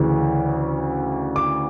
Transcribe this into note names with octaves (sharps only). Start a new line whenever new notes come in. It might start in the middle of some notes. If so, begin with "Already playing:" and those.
Already playing: D2 C#3 E3
D6